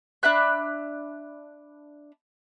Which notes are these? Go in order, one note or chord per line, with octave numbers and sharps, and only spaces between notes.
D4 E5 B5 F#6